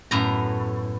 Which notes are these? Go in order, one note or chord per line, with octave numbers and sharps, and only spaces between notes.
F#2 A2 B3 A#5